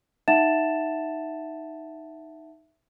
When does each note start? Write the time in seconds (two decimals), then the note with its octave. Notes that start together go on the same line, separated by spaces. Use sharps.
0.28 D#4 E5 F#5 A5 A6 E7